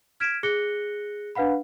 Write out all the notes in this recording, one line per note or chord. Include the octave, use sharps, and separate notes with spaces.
F6 G#6 B6 D7 E7
G#4 F#6 A#6 C#7 G7
D4 B4 F5 F#5 B5